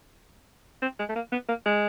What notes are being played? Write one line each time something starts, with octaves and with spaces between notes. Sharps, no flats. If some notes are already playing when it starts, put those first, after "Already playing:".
C4
G#3
A3
A#3
B3
A#3
G#3